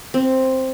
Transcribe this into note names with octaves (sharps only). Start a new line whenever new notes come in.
C4